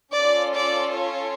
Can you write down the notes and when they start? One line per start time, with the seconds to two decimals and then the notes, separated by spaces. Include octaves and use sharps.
0.15 C#4 F4 A4 D5
0.55 D5
0.95 C#5